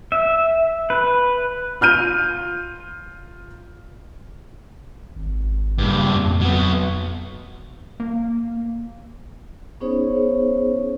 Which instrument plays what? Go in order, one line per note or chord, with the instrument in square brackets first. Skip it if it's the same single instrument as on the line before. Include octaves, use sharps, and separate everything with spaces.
[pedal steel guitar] E5
B4
[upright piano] F4 F6 G6 D#7
[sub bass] G#1
[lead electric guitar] G2 A#2 [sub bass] C#3
[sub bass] F2
[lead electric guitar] F#3 B3
[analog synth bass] A#3
[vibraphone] B3 C#4 D#4 G#4 C5 C#5